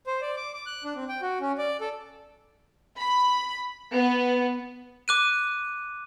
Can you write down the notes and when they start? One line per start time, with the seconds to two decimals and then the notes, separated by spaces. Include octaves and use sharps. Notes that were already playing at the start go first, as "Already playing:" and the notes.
0.07 C5
0.21 D5
0.37 D6
0.53 D6
0.66 F#6
0.84 D4
0.96 C4
1.09 G5
1.22 F#4
1.41 C#4
1.58 D5
1.81 A4
2.97 B5
3.93 B3
5.08 D6 F#6 D#7